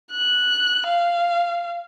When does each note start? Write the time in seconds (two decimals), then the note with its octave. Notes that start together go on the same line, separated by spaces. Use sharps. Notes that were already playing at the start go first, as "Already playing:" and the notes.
0.11 F#6
0.87 F5